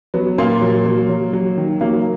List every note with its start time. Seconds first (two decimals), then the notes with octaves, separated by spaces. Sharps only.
0.14 F#3 B3
0.38 A#2 A#3
0.61 F#3
0.86 F#3
1.09 F#3
1.33 F#3
1.57 D#3
1.81 F#3 A#3